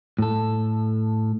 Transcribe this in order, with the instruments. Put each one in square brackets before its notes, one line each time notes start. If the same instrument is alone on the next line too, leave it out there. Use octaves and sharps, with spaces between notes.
[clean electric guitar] A2 A4